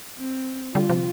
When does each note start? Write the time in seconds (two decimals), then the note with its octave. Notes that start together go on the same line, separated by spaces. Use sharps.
0.18 C4
0.75 D3 G3 F4
0.89 C3 F3